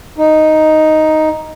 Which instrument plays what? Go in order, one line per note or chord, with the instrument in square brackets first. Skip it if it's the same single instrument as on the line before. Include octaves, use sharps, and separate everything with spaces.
[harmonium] D#4